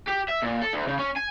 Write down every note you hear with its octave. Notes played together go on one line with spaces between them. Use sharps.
G4
E5
A#2
A4
D2
C#3
C#4
G#5